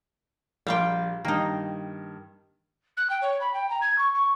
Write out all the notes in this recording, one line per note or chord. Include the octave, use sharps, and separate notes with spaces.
A#1 G3 F5 G5 C6
G2 D#3 A#3 D#4
F#6
G5
C#5
B5
G5
A#5
G#6
C#6
C#6